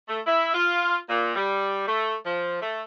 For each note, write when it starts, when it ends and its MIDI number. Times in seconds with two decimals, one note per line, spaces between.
0.08 0.20 57
0.27 0.54 64
0.54 0.97 65
1.08 1.32 46
1.35 1.84 55
1.87 2.15 57
2.25 2.61 53
2.61 2.82 57